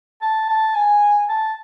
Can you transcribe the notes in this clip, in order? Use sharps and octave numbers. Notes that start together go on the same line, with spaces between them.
A5
A5
G#5
A5